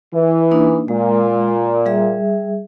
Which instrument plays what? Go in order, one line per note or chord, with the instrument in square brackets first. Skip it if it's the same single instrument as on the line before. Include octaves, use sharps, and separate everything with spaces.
[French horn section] E3
[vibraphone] A#3 D4 D#4
[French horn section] A#2 [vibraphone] G#3
[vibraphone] G3 G#4 E5